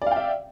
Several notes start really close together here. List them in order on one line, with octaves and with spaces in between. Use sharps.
D5 F5 G5 E5